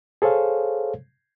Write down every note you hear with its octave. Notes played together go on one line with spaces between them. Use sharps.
G#4 A4 C5 C#5 F5